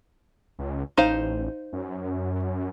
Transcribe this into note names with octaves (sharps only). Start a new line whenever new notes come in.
C#2
A1 D#4 C5 F5
F#2